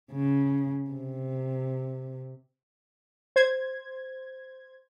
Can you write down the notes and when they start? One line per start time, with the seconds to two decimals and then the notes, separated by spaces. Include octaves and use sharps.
0.12 C#3
0.91 C3
3.36 C5 G#6